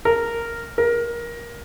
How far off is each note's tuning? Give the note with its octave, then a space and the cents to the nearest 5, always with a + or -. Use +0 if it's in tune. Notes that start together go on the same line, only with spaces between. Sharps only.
A#4 -5
A#4 +20